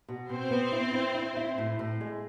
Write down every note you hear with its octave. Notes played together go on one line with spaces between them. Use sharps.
B2
B2 C4 C5
B3
E4
E4
E4
E4
A2
A2
G#3